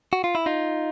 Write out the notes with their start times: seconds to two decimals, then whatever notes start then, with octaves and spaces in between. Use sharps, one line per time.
0.13 F#4
0.24 F4
0.35 E4
0.46 D#4 F4